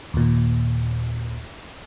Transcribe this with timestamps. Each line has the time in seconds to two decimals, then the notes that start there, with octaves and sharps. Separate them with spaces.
0.14 D#2 A#2